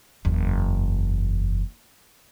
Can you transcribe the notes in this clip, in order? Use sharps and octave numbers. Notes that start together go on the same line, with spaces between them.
F#1 E2